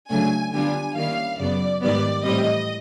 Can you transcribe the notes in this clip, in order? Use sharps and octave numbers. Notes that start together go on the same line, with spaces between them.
C#3 F#3 A3 D4 G#5
D3 G3 B3 D4 F4 G#5
D#3 G3 A#3 C#4 E4 F5
F#2 C#3 F#3 B3 D5
G#2 D#3 G3 B3 D5
A2 E3 G3 C4 D#5